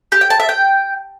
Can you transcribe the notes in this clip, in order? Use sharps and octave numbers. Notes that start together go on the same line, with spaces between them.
G4
G5
A5
E5
G5